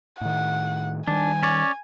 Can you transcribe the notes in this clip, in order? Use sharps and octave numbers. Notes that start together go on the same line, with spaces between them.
A2 D#3 F#5
D#3 G3 D4 G#5
C#4 C#5 D5